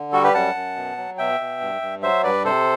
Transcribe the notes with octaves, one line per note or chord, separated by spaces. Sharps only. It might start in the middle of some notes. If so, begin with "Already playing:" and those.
Already playing: D3
G3 F#4 A4
G4 B4
F#2 F#5 A5
F#2
B2
F#3
B2 E5 G5
B2
G2
G2
F#3 C5 E5
G2 B4 D5
C3 A4 C5